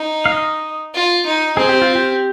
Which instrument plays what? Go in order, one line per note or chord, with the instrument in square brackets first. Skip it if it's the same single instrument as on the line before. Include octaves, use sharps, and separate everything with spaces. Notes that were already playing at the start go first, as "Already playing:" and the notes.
Already playing: [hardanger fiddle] D#4
[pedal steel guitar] F5
D#5
[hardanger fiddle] F4
D#4
[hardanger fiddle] C4 [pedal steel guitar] G#4
[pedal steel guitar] G4
F4
G4